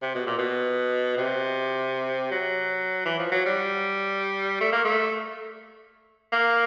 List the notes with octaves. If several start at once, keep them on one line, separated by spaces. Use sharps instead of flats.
C3
B2
A#2
B2
C3
F#3
E3
F3
F#3
G3
A3
A#3
A3
A#3